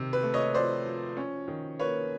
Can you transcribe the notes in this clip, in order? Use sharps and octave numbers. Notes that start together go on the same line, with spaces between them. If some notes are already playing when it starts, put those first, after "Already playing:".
Already playing: C3 D#3
B4
A3
C#5 D#5
F3 C5 D5
F3
C#4
D#3
A#3 B4 C#5